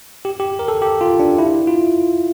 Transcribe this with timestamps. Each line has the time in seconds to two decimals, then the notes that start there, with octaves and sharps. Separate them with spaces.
0.25 G4
0.40 G4
0.59 A#4
0.68 A4
0.82 G4
1.01 F4
1.20 D4
1.38 E4
1.67 F4